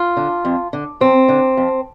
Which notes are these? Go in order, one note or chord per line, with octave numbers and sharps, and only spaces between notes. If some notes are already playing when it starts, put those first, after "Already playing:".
Already playing: F4
D3
F2
D3
F2 C4
D3
F2